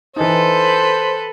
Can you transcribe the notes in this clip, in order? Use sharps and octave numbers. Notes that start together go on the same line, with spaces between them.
E3 D#4 A4 B4 C5